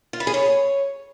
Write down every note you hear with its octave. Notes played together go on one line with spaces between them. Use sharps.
F4
B4
G#4
C#5